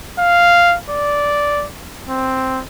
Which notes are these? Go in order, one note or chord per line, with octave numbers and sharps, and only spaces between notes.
F5
D5
C4